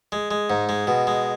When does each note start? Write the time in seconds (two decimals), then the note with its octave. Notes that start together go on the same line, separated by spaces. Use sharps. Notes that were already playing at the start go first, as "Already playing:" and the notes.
0.12 G#3
0.31 G#3
0.50 G#2
0.69 G#3
0.87 B2
1.07 G#3